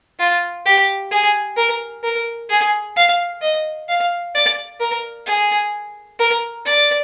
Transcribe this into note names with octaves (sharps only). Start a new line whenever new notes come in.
F4
G4
G#4
A#4
A#4
G#4
F5
D#5
F5
D5
A#4
G#4
A#4
D5